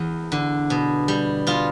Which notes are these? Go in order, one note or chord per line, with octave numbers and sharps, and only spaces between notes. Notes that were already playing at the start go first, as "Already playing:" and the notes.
Already playing: E2
D3
B2
G3
B2 F4